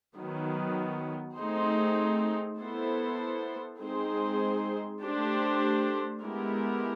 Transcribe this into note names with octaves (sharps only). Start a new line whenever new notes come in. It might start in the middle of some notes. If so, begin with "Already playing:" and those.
D#3 F#3 B3
A3 C4 D#4 G#4 C5
B3 E4 A4 C5
G#3 C4 D#4 G#4 C5
A3 D4 G4 C5
G#3 B3 E4 G4 A#4